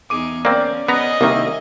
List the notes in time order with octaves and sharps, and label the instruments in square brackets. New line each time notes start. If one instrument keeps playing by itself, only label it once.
[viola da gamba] E2 D#4 G#4 [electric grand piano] D6 D#7
[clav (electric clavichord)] A#3 C4 [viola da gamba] C#4 [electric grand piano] D5
[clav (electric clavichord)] B3 A#5 [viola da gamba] C#4 G#4 D#5
[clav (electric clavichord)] C2 D#3 [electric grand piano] A#3 E5